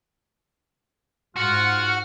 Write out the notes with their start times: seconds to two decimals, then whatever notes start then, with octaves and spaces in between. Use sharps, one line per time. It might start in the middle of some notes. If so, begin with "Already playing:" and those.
1.36 G#2 F4 F#4 F#5 F6